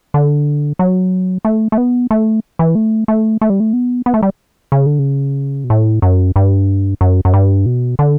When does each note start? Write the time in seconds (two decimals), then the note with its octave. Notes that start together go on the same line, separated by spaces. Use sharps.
0.14 D3
0.79 F#3
1.45 A3
1.72 A3
1.78 B3
2.11 A3
2.59 E3
2.75 A3
3.08 A3
3.41 A3
3.50 G3
3.60 A3
3.73 B3
4.06 B3
4.14 A3
4.23 G3
4.72 C#3
4.86 D3
4.99 C#3
5.64 B2
5.70 A2
6.02 F#2
6.36 G2
7.01 F#2
7.25 F#2
7.34 G2
7.66 B2
7.99 D3